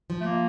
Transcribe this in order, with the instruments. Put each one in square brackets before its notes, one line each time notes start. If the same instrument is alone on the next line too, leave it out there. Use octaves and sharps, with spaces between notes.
[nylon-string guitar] F3
[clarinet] A3
A#3